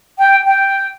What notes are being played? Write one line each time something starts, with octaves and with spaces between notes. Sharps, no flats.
G5
G5